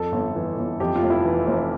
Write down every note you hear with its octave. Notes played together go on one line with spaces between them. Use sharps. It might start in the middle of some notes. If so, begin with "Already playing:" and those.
Already playing: F2 A4
G1
E3
G1
F2 G4
F4
F1
E4
E3
F1